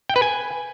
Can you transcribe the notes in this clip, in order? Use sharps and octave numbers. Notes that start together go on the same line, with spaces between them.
G5
B4
G#5